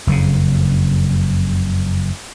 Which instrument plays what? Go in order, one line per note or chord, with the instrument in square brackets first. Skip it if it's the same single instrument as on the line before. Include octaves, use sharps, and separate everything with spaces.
[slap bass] F#1 F2 A2 C#3